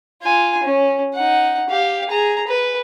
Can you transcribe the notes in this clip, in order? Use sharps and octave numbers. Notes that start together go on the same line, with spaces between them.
F4 G#5
C#4
D#4 F#5
G4 F5
G#4 A#5
B4